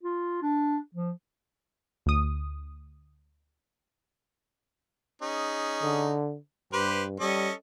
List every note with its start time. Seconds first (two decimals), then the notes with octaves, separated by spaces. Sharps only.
0.03 F4
0.43 D4
0.95 F3
2.06 D2 D#6
5.22 C#4 D#4 G#4
5.83 D3
6.73 G2 G4 B4 C5
7.20 G3 C#4 A4 D#5